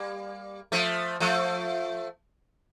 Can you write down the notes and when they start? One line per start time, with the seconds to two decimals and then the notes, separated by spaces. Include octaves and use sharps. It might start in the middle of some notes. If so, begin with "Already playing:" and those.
Already playing: G3 A#3
0.72 F3 A3
1.20 F3 A3